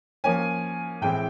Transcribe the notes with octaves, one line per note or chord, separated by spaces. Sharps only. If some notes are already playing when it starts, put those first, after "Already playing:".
F3 A#3 C#4 G#5
A2 E3 G#3 C4 E4 G5